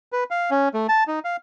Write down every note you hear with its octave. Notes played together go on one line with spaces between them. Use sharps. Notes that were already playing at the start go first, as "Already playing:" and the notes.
B4
F5
C#4
A3
A5
D#4
F5